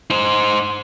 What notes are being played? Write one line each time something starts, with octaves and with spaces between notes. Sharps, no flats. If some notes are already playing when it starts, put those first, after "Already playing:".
D#4 C5